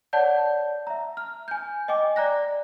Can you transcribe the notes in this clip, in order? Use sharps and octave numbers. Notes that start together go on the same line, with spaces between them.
C#5 D5 F#5 A5 G6
E5 A#5
F6
G#5 G6
D#5 G5 G#5 D6
D5 A#5 F#6 A#6